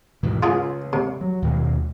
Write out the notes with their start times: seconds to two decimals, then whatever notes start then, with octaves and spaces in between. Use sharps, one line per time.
0.23 G#2 B2 E3
0.43 C#3 G#3 F4 G#4
0.93 C3
1.21 F#3
1.42 D#2 B2 G#3